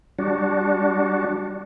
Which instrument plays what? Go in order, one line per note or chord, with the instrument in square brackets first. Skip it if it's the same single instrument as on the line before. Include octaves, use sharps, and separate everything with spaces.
[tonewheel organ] G3 D4 F#4